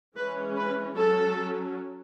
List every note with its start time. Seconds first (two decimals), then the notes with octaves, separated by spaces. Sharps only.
0.16 E3 G#3 C#4 B4
0.57 B4
0.97 F#3 C#4 A4